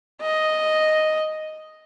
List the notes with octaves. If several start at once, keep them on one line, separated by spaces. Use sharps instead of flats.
D#5